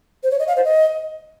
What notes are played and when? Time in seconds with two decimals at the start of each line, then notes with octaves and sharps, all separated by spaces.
0.23 C5
0.31 C#5
0.39 D#5
0.48 F5
0.56 C5
0.65 D#5